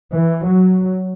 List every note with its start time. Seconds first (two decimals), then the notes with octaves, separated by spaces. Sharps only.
0.14 E3
0.45 F#3